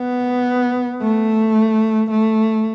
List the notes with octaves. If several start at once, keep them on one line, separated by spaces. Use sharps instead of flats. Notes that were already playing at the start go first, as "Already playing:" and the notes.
Already playing: B3
A3
A3